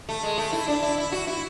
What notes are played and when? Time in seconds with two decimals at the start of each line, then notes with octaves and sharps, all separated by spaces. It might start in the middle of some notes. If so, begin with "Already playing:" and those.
0.09 A3
0.23 G#3
0.38 A3
0.53 E4
0.68 D4
0.83 E4
0.98 E4
1.12 F#4
1.27 E4